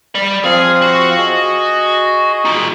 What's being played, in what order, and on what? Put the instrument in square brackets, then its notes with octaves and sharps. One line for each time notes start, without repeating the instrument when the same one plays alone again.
[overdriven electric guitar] D5 B5
[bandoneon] F3 C4 F5 [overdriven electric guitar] G#4
[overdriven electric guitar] F#4
[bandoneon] G#4 D#5
[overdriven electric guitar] D#4 F4